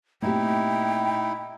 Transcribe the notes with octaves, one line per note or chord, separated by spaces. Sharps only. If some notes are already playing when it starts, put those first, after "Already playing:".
A#2 A3 C4 D#4 E4 G4 G5